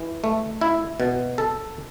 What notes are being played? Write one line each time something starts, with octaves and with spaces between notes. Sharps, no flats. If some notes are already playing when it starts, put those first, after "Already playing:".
Already playing: E3
A3
E4
B2
A4